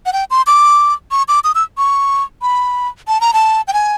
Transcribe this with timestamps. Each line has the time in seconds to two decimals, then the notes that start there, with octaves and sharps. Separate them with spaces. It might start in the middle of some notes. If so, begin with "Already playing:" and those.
0.06 F#5
0.13 G5
0.30 C6
0.47 D6
1.11 C#6
1.28 D6
1.44 D#6
1.55 E6
1.78 C#6
2.42 B5
3.08 A5
3.21 A#5
3.33 A5
3.68 G5
3.73 G#5